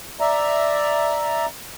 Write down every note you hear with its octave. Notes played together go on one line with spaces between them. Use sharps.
D5 E5 A#5